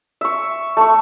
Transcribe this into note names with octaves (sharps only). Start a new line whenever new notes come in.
E5 C#6
A3 C#6